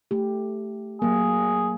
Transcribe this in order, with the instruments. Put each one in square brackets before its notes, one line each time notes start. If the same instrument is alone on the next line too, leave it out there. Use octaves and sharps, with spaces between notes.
[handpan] A3 G4
[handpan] F#3 A#3 [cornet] G#4